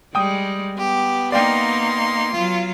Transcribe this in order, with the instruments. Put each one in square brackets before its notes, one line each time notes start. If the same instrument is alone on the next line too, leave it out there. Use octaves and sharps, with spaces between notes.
[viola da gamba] G3 G#3 [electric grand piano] G5 D#6
[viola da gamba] B3 [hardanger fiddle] G4
[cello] A#3 D#4 [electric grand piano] D5 F5 G5 [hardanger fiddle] C6
[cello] F#3 F4